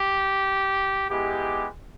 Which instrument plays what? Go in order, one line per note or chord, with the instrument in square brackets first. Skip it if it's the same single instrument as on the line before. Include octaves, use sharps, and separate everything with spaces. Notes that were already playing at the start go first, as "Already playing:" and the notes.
Already playing: [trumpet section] G4
G#3 B3 E4 G4